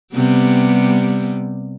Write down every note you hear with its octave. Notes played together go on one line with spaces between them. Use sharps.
C3 G3 B3